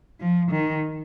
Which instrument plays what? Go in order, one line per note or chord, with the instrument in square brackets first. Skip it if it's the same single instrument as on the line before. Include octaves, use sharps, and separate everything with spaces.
[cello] F3
D#3